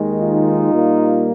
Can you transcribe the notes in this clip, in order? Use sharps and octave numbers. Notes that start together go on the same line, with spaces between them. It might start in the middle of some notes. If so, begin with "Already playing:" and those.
Already playing: D#2 D#3 G#3
D#4 F4
A#2 G3 A#3